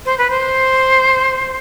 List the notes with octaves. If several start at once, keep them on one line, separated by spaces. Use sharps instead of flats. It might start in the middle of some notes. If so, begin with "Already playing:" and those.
C5
B4
C5